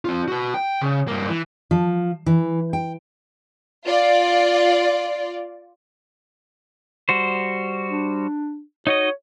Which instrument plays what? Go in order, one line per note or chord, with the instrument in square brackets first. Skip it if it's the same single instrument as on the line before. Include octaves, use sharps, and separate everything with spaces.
[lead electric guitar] C4 F4
F#4 B4
G5
C#3
G2 A#3
E3
[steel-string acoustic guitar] F3
E3
G5
[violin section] F4 D5
[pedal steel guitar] G3 F#4 C5
[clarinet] D4
[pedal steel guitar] D#4 F#4 D#5 [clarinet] C#5